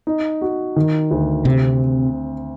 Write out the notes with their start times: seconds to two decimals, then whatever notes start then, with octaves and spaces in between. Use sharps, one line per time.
0.07 D#4
0.41 F#4
0.76 D#3
1.11 D2
1.45 C3 C4